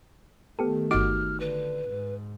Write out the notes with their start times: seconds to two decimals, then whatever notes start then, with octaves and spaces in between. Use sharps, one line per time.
0.59 D#3 A3 B3 G4 A4
0.91 G1 D#4 F#4 D6 F6
1.40 D3 B4
1.89 G#2